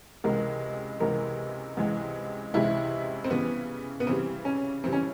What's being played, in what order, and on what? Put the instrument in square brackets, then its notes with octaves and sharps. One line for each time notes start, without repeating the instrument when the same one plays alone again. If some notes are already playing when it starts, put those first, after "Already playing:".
[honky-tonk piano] C#2 C3 E3 G#3 [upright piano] A#4
[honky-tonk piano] C#2 C3 E3 G#3 [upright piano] A#4
[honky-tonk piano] C#2 C3 E3 G#3
[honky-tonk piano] C#2 C3 E3 G#3 [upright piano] E4
[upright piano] C4
[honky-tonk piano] C#3 E3 G3 [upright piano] B3
[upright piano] B3
[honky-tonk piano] C#3 E3 G3 [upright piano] C4
[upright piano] C#4
[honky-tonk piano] C#3 E3 G3 [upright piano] C4
[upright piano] C#4